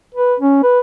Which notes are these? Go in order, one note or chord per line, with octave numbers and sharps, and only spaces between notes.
B4
C#4
B4